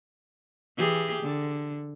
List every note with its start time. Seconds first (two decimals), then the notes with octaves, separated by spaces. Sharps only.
0.77 E3 G4 G#4
1.22 D3